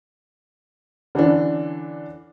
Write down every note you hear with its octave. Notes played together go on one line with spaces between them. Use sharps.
D3 E3 C#4 D4